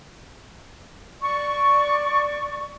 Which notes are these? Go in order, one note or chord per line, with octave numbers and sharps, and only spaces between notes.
D5 C#6